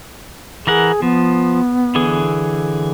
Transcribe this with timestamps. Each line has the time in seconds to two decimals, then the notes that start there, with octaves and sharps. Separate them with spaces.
0.67 E3 G#4 A#4 F#5
1.02 F3 B3
1.95 D3 E3 G#4